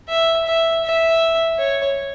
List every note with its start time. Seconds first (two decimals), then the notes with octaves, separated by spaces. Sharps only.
0.09 E5
0.47 E5
0.84 E5
1.59 C#5